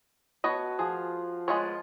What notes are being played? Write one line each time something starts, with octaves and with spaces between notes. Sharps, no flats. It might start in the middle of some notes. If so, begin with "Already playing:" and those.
B3 F#4 C#5 D#5 A5
F3 G#4
G#3 B3 F4 C#5